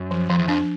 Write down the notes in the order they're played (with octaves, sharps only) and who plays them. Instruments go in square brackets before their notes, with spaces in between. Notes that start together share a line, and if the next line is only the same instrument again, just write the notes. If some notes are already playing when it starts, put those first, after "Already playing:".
Already playing: [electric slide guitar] F#2
[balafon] F3
[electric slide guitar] F2 [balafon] F3
[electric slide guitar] E2
[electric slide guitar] F2 [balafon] D4